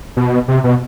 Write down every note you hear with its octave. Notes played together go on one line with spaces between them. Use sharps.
B2
C3
B2